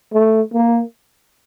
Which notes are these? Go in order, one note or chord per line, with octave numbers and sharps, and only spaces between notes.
A3
A#3